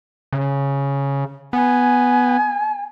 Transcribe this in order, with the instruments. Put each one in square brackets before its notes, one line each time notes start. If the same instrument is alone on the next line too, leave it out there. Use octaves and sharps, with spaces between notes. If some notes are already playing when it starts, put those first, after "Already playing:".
[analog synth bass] C#3
[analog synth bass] B3 [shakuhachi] G#5